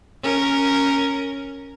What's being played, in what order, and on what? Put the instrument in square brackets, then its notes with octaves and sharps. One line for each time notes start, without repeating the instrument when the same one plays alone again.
[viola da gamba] C#4 A#4